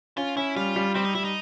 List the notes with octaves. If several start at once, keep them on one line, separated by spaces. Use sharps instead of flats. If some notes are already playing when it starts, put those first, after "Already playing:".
C#4 F4
C#4 E4
G3 F4
G3
G3 C4
D#4
G3 E4
D#4